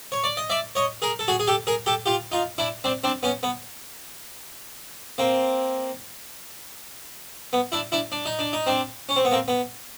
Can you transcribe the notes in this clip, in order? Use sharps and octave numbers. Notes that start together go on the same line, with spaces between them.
C#5
D5
D#5
D5 E5
C#5 D#5
G#4 A#4
A4
F#4 G#4
G#4
G4 A4
G#4 A#4
G4 A4
F4 G4
D#4 F4
D4 E4
C4 D4
C4 D4
B3 C#4
B3
A#3 C4
B3
D4 E4
D4 E4
D4
D#4
D4
D#4
C4 D4
C#4
C4
B3
A#3 C4
B3